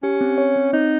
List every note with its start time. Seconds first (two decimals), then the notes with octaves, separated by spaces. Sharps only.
0.03 C#4 G4
0.21 C4
0.38 C#5
0.56 C4
0.73 C4 D#4